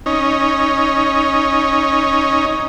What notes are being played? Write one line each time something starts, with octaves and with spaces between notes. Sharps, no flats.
C#4 D#4